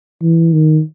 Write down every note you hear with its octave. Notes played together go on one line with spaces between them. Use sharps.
E3
D#3